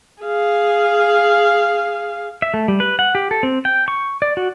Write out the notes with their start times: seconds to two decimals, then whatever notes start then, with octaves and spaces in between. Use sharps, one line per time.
0.22 G#4 F5
2.42 E5
2.54 A3
2.68 G3
2.80 B4
2.99 F#5
3.15 G4
3.31 A4
3.43 C4
3.65 G5
3.88 C#6
4.22 D5
4.37 F#4